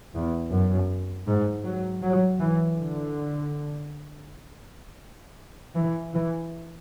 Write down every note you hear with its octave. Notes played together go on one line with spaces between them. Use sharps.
E2
F#2
G#2
F#3
F#3
E3
D3
E3
E3